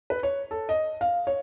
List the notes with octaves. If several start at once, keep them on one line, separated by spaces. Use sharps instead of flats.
B4
C#5
A4
D#5
F5
C#5